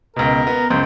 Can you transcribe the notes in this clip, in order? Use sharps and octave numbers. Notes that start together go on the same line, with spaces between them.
C#2 B2 A#4
B3
C#2 F#2 C5